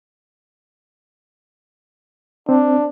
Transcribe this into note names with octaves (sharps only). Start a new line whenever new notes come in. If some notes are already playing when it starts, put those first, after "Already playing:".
C4 D4